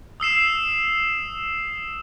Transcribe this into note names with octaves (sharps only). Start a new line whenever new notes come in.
D#6 E6 C7 E7